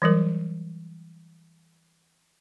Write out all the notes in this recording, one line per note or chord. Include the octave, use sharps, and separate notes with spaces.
E3 F#3 G3 A#4